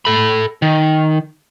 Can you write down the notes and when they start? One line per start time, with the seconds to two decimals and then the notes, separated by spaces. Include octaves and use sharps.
0.05 A4 B5
0.62 D#3